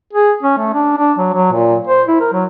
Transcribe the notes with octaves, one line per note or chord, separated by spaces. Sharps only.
G#4
C#4
A3
D4
D4
F#3
F#3
A#2
C5
E4
A#4
F#3